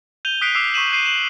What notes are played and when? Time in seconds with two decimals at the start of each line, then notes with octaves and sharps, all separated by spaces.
0.25 G6 D#7 F7 G7
0.41 D#6 F#6 B6 C7 D7
0.54 D6 E6 C7 D7
0.74 C#6 D#6 B6 D#7 E7 F#7
0.92 G6 C7 D#7
1.06 E7 F#7